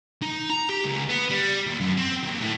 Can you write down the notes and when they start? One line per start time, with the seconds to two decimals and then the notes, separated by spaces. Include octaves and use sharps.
0.22 D#4
0.50 A#5
0.69 G4
0.84 C#2
1.09 B3
1.30 G3
1.66 D#2
1.81 F#2
1.97 C4
2.23 D#2
2.40 A2